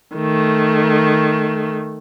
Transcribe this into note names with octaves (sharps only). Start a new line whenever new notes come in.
D#3 A3